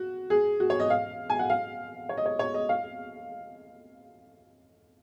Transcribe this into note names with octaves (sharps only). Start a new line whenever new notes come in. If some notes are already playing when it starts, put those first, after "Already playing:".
Already playing: F#4
G#4
F#4
C#5
D#5
F5
G#5
F#5
F5
C#5
D#5
C#5
C#5
D#5
F5